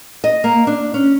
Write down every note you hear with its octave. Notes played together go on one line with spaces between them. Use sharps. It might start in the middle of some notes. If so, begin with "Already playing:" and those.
D#5
A#3
D4
C#4